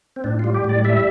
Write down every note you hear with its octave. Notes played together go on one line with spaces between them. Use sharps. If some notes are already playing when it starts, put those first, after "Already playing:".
C4
A2 D4
G3 F4
G4
A2 D5
G3 E5